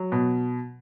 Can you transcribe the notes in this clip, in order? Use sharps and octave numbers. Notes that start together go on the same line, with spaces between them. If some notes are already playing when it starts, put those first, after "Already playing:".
Already playing: F#3
B2